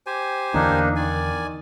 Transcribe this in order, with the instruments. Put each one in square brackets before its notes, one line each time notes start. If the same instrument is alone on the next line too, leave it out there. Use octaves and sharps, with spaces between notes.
[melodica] G4 C5 G#5
[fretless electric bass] E2 D3 [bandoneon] A#3 D4 D#4
[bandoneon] D#3 [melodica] D5 G#5